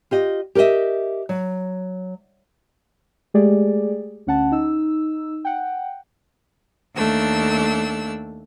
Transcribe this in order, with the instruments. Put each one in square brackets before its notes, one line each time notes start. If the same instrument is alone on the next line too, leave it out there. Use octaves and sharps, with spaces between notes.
[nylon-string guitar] F4 G4 D#5
G4 A#4 C#5 D#5 E5
F#3
[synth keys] G#3 A3 G4 G#4 D5
D2 C#4 F#5 A5
D#4 E6
F#5 G5
[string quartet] D#2 A3 D4 E6